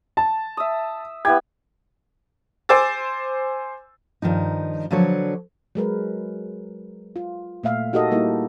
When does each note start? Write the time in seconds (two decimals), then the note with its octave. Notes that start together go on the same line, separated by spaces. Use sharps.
0.17 A5
0.57 E5 D#6
1.25 B3 E4 G4 G#6
2.69 C5 G#5 D6 E6 A6
4.22 G2 A#2 D#3 F3 D#4
4.91 D3 F3 F#3 D4 B4 C#5
5.75 F#3 G#3 A#4 B4
7.16 F4
7.64 A#2 A3 E5 F5
7.93 D#4 F#4 G4 A4 A#4 D#5
8.11 G3 A#3 D#4 E4